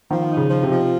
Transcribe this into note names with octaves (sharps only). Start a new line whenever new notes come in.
D#3 F3
D#4
C#3
F3
C3
F3